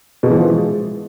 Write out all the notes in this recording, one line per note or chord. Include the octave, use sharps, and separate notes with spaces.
B2
E3
F3
E3
G#3